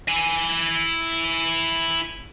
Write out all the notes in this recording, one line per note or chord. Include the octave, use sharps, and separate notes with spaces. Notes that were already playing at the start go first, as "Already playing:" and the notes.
E4 G#5